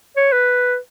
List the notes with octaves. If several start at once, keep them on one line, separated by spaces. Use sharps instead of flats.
C#5
B4